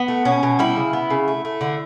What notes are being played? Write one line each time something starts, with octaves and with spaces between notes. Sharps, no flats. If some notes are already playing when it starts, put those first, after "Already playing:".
Already playing: B3
A3
B2 C#4
B2
G3 E4
C#3
B3
C#3
A3
A3
D3